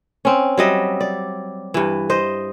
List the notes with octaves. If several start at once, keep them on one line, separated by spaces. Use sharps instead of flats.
C4 C#4
F#3 G3 D#5 E5
D5
G2 E3
C5 D#5